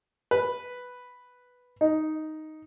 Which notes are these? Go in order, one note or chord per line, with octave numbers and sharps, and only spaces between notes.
B4
D#4